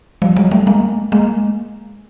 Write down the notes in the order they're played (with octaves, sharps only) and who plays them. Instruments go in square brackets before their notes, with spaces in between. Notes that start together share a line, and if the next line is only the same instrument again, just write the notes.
[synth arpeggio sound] F3 G3
F#3 G#3
G3 A3
G#3 A#3
G#3 A#3